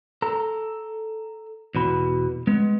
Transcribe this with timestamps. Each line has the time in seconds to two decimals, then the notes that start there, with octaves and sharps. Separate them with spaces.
0.22 A4 A#5
1.75 E2 B2 B5
2.47 G#3 B3